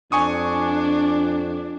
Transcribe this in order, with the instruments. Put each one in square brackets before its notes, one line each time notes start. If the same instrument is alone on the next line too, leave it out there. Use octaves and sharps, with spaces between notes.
[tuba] F2 [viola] D4 [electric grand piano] G#5 C#6 D#6